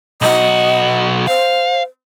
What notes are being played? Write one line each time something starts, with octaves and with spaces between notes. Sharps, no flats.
B1 F#4 D#5
C5 F5